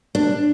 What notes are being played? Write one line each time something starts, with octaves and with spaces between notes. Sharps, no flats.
D4